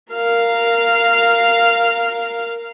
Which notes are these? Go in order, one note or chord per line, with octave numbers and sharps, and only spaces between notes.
A#4 F5